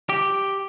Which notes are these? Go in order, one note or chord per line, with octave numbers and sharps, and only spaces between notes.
G4